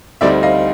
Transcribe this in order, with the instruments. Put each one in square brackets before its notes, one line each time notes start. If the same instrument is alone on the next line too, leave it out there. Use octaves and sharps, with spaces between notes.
[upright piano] D2 D3 G3 C4 D#4 D5 E5
D#5 F5